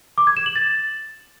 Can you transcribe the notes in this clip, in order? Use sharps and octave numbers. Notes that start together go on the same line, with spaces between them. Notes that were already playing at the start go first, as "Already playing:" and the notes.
D6
G#6
E7
F#7
A6